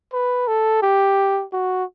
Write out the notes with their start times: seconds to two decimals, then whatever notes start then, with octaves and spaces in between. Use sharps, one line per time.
0.13 B4
0.48 A4
0.83 G4
1.53 F#4